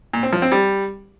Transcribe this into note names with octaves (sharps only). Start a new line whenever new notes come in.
A#2
C4
F3
C4
G3